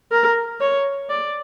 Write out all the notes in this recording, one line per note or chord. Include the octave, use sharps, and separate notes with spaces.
A#4
C#5
D5